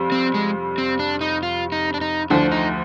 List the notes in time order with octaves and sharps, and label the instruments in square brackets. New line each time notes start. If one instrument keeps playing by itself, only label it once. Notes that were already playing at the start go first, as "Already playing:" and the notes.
Already playing: [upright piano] F2 C3 G3
[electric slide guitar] C4
G#3
C4
D4
D#4
F4
D#4
D4
D#4
[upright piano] D2 D3 F3 [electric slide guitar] D4
[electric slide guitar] D#4